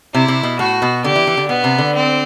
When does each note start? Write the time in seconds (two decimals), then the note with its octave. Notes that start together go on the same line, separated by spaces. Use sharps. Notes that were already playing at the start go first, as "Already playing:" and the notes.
0.14 C3 E4
0.28 C3
0.43 B2
0.59 A2 F#4
0.82 B2
1.04 D3 G4
1.16 E3
1.27 E3
1.37 D3
1.48 B2 B3
1.64 C3
1.78 D3
1.94 C4